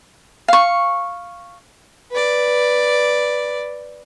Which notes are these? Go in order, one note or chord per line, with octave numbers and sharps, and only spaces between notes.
F5 C#6
B4 D5